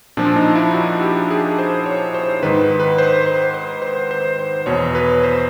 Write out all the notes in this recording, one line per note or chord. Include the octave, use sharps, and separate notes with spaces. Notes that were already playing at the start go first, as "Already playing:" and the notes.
A#2 F3 D4
D#4
E4
F#4
G4
G#4
C5
C#5
C5
G#2 D#3 B4
B4
C5
C5
C5
C5
C5
C5
E2 B2 C#5
B4
C5